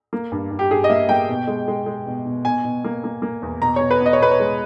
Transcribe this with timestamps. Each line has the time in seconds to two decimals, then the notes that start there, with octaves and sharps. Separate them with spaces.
0.13 A#3
0.32 G2
0.51 G2
0.59 G4
0.70 G2 G#4
0.84 D#5
0.89 A#3 E5
1.09 A#3 G5
1.29 B2
1.47 G#3
1.68 G#3
1.86 G#3
2.07 B2
2.25 B2
2.45 B2 G#5
2.64 B2
2.84 A#3
3.04 A#3
3.22 A#3
3.42 E2
3.62 B2 A#5
3.76 B2 C#5
3.91 B4
4.01 B3
4.06 D#5
4.13 C#5
4.20 B2 B4
4.31 C#5
4.40 G#3